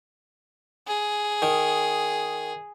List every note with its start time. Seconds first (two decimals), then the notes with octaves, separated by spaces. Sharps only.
0.88 G#4
1.42 D#3